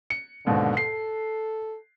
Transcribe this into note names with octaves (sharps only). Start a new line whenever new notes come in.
C#7
D#2 G#2 B2 D3
A4 C7